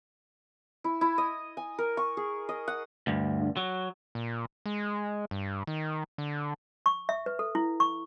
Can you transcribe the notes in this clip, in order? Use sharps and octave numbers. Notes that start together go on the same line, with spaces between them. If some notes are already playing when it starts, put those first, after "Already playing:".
E4
E4
D#5
G#5
A#4
C#6
G#4
D#5
F#5
D2 G2
F#3
A#2
G#3
G2
D#3
D3
C#6
E5
B4
A4
E4
C#6